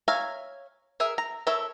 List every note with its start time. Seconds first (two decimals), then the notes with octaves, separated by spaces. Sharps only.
0.08 C#5 E5 F5 G#5 A#5
1.00 G#4 A#4 E5
1.18 A#5
1.47 A4 A#4 C#5 E5